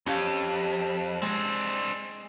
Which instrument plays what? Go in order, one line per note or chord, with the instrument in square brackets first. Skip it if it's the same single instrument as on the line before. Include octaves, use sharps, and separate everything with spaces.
[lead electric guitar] F2 [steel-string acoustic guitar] C#4 G4 F5
[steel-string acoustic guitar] G#3 [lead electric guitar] C4 D4